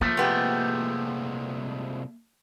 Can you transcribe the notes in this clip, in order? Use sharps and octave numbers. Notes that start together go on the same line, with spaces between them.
F3 A3 A#3
C2 C3 G#3 B3 G4